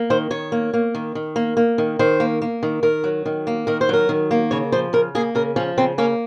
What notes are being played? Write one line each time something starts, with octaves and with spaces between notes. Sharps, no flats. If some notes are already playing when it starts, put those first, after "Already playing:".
Already playing: A#3
D#3 C5
D#3 C#5
A#3
A#3
D#3
D#3
A#3
A#3
D#3
D#3 C5
A#3
A#3
D#3
D#3 A#4
F#3
D#3
A#3
D#3 A#4
C5
F#3 A#4
D#3
A#3
C#3 C#5
F3 C5
C#3 A#4
A#3 G#4
C#3 A#4
F3 C#4
C#3 C4
A#3 C#4